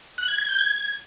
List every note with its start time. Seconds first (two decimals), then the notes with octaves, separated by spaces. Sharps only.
0.18 F#6
0.28 G#6
0.38 G#6
0.49 G6
0.59 G#6